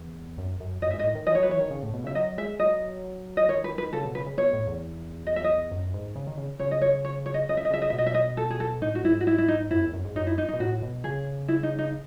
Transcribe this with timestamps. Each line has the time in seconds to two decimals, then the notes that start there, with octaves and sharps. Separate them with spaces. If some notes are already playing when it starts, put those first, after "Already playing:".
Already playing: E2
0.38 F#2
0.60 F#2
0.82 F#2 D#5
0.91 G#2 E5
0.99 D#5
1.04 A2
1.15 D#3
1.27 E3 D#5
1.35 F#3 C#5
1.43 B4
1.49 E3 C#5
1.59 D#3
1.70 C#3
1.83 A2
1.94 B2
2.04 C#3 E5
2.15 F#3 D#5
2.38 G#3 E5
2.59 F#3 D#5
3.37 D#5
3.49 D#3 C#5
3.64 B4
3.78 B4
3.93 C#3 A4
4.05 B2
4.15 C#3 B4
4.26 C#3
4.37 B2 C#5
4.53 A2
4.67 E2
5.27 D#5
5.36 E5
5.44 D#5
5.71 F#2
5.94 G#2
6.16 C#3
6.27 D#3
6.38 C#3
6.59 C#3 C#5
6.71 D#5
6.81 C#5
7.05 C#5
7.26 C#5
7.34 D#5
7.49 C#3 D#5
7.57 E5
7.65 D#5
7.71 C#3 E5
7.82 D#5
7.90 B2 E5
7.98 D#5
8.06 E5
8.14 D#5
8.37 A4
8.50 G#4
8.60 A4
8.82 A2 D#4
8.95 F#4
9.04 G#2 E4
9.21 F#4
9.27 E4
9.38 E4
9.48 D#4
9.71 F#2 E4
9.82 E2
9.94 F#2
10.04 G#2
10.16 F#2 D#4
10.27 E4
10.38 D#4
10.49 D#4
10.54 B2
10.60 A2 F#4
10.82 B2
11.04 C#3 G#4
11.48 E4
11.63 D#4
11.78 D#4